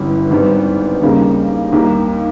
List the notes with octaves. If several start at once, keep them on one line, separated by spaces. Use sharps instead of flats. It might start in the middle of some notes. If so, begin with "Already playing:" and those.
Already playing: G1 G2 E3 G3 C#4
G#1 G#2 D#3 G3 B3
D#2 C#3 G3 A#3 D#4
D#2 D#3 G3 A#3